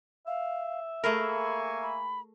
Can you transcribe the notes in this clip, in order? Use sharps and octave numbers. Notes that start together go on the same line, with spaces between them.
E5 F5
A3 A#3 G#4 A#4 G#5 B5 C#6
B5